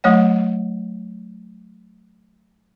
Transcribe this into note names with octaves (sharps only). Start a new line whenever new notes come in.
F#3 A3 C#5 F#5